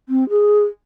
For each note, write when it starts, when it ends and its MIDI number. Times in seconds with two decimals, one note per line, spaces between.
0.09 0.27 60
0.29 0.63 68